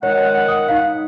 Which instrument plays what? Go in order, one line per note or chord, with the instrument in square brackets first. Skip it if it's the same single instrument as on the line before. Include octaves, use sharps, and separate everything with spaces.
[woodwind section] D#3 G#3 F#5 [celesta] C#5
[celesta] D#6
D#4 F5